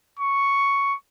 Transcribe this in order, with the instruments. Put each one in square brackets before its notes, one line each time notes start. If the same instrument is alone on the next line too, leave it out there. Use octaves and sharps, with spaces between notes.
[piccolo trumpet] C#6